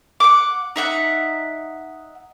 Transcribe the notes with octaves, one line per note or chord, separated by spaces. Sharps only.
F#5 D6
D#4 E5 F#5 A#5